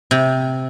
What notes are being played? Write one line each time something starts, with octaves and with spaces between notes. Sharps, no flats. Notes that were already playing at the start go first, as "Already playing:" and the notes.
C3